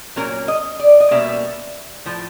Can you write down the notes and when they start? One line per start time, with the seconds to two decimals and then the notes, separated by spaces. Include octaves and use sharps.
0.16 A#2 F#3 A#3 C#4 A#4
0.48 D#5
0.80 D5
1.00 D#5
1.11 B2 G3 A#3 C#4 E5
2.06 A2 F3